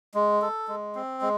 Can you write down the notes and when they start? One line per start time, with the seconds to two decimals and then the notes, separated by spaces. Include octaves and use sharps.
0.14 G#3
0.42 A4
0.68 G#3
0.95 C4
1.22 G#3